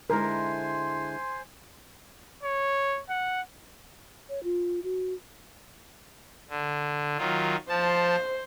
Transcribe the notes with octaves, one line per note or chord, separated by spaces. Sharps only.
D3 G#3 E4 A#4 C5 G#5 C6
C#5
F#5
C#5
F4
F#4
D3
D#3 F#3 F4
F3 C5 A5